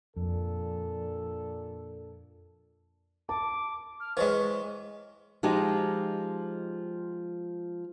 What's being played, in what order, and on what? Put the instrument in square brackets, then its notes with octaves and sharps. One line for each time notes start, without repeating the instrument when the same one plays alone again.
[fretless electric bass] F2 [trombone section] A#2 D4 A4
[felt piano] A5 [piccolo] D6
[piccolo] F6
[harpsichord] E3 G#3 [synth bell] C5 C#5 D#5 [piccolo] C#6
[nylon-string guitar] F3 G#3 D#4 G4